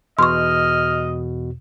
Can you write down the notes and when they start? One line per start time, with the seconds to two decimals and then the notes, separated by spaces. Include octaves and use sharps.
0.19 E2 B2 D#5 C6 C#6 F6